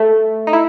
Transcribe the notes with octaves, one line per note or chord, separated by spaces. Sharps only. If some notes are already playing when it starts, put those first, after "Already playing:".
Already playing: A3
D#4
E4